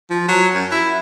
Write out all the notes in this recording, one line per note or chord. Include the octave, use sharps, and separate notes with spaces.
F3
F#3
F#2
E4